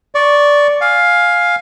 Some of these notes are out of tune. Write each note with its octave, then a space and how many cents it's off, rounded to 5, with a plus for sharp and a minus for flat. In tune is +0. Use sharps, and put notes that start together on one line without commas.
D5 -10 C#6 +0
F5 +10 G#5 +0